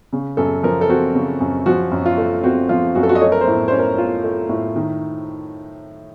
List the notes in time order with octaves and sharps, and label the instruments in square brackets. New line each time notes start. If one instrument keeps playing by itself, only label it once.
[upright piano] C#3
F#2 A4
F3 A#4
A4
C4 F#4
C#3
F#2
F3 F#4
F#2
F4
A3
C4 F#4
F3 F4
F#2 F#4
A4
F#4
D#5
A3 C#5
A#4
C5
A2
C#4 C5
A#4
F4
A3
A2
D#3